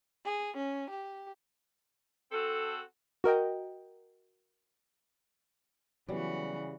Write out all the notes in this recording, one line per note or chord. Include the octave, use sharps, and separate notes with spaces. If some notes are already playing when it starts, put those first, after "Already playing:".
G#4
C#4
G4
C4 F#4 A4
F#4 A#4 D#5 G5
C#3 E3 F#3 G3 B3 F#4